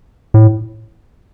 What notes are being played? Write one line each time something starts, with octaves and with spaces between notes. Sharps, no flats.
A2